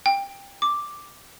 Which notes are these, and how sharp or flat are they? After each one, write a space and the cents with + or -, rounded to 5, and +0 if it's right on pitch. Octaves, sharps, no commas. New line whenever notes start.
G5 +20
D6 +0